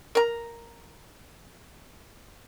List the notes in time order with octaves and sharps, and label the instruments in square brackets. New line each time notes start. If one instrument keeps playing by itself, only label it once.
[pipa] A#4 A#5